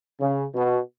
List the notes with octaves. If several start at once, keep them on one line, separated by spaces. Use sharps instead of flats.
C#3
B2